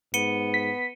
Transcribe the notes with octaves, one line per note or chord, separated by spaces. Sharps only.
G#2 B3 C#7 D#7 G7
B6